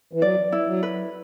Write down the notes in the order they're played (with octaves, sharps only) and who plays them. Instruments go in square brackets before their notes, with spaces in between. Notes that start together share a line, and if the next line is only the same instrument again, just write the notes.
[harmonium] E3
[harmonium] F#3 [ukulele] D5
[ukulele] E4
[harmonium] F#3
[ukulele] B4